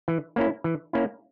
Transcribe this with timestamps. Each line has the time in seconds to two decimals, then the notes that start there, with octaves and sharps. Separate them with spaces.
0.08 E3
0.36 A#3 C#4 E4
0.64 E3
0.93 A#3 C#4 E4